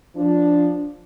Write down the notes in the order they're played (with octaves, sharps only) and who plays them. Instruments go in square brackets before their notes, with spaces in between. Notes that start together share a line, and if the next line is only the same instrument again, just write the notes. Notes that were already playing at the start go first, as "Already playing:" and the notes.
[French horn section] F3 D4